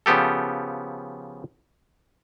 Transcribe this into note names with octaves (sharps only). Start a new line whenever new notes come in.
C#3 F3 B3 G4 A4